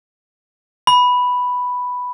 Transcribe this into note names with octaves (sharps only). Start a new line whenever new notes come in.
B5